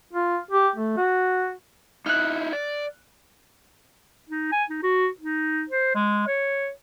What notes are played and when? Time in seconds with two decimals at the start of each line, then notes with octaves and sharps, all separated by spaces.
0.13 F4
0.51 G4
0.76 A3
0.97 F#4
2.06 D#4 E4 F6 F#6
2.53 D5
4.29 D#4
4.52 G#5
4.70 D#4
4.83 F#4
5.20 D#4
5.69 C5
5.95 G#3
6.27 C#5